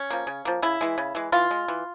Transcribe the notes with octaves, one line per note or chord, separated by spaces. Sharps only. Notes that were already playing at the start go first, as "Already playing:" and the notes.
Already playing: C#4
F3 A#3
C#3
F3 A#3
C#3 E4
E3 G#3
C#3
E3 G#3
E3 F4
G#3
E3